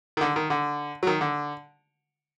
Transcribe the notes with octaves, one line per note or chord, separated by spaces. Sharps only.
D#3
D3
D#3
D3
F#3
D#3
D3